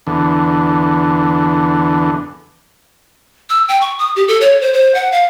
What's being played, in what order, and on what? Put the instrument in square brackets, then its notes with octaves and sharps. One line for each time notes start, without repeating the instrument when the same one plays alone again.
[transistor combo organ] E2 D3
[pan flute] E6
G5
C#6
D#6
G4
A4
C#5
C5
C5
F#5
F5